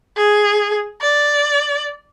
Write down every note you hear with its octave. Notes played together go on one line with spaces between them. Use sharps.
G#4
D5